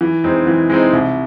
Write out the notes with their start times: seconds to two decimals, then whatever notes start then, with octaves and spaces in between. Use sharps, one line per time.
0.01 E3
0.24 G#3 C4 D#4
0.47 E3
0.70 G#3 C4 D#4
0.93 C2